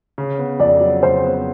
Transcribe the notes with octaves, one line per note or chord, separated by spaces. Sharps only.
C#3
B3
F2 D5
F#3
C#3 C5
B3